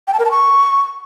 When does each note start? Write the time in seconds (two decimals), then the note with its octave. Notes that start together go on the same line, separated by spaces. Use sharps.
0.08 G5
0.13 A5
0.19 A#4
0.25 A5
0.31 C#6